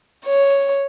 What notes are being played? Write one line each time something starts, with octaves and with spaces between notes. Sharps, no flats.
C#5